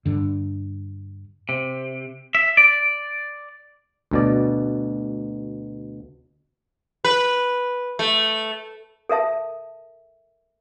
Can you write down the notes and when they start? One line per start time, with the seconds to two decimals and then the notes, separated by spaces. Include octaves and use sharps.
0.06 G2 D3
1.49 C3
2.35 E5
2.57 D5
4.11 D2 B2 D5
7.05 B4
7.99 A3
9.09 A4 A#4 E5 A5